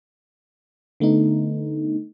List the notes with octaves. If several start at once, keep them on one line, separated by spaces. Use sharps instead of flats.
D3 A3 B3 D#4